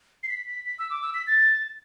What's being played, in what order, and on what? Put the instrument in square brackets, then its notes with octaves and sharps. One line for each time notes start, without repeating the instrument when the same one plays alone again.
[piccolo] C7
B6
B6
B6
E6
D6
E6
B6
A6